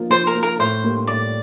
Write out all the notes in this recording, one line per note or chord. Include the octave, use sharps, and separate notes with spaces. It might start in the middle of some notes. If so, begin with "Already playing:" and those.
Already playing: F3 A#3 F4
F3 C5
A#4
A#3 F4
A#4
A2 C5
G3 A#3
A2 D5